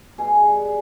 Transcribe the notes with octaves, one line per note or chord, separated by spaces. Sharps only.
B2 G#4
G3